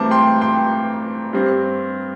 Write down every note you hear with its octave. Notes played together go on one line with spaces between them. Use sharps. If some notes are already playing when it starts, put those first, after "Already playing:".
Already playing: G2 E3 A3 C4 A5 D6
G5 C6
G5 C6
G2 G3 C4